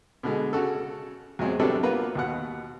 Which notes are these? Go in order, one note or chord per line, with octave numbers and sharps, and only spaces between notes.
B2 D3 G#3
C#3 F#4 A4
E2 F#3 G#3 C4
C3 F#3 G3 B3 D4 A4
A#3 B3 F4 A#4 B4
D#2 B2 F#5